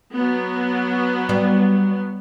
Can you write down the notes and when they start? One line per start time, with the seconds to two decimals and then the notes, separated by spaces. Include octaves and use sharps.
0.15 F#3 B3
1.29 G3